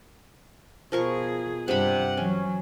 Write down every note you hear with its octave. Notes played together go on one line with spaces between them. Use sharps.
B2 F3 G#4 A#4 C#6
G2 C3 D4 F#5 B5
E3 F#3 C#4